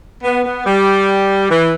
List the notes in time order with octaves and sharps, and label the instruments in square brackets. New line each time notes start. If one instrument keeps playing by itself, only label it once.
[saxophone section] B3
B3
G3
E3